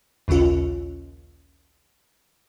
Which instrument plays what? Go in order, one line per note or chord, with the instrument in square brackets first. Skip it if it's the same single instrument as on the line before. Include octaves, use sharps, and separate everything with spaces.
[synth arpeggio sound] A#1 D#2 C#3 C#4 F4